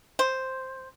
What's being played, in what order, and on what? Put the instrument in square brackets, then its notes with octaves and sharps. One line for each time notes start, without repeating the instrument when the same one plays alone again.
[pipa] C5